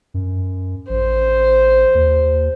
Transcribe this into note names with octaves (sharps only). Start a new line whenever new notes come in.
F#2
A1 C5
D#2